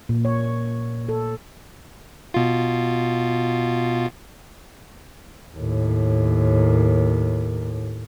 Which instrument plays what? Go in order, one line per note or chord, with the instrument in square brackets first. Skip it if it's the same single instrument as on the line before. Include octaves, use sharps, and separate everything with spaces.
[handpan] A#2
C#5
A4
[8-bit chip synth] B2 F4
[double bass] D#2 A2